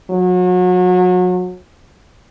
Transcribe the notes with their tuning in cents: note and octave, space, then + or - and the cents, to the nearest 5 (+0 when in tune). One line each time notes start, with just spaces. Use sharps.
F#3 -30